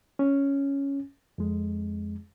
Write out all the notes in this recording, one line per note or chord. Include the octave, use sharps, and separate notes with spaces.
C#4
F2 G#3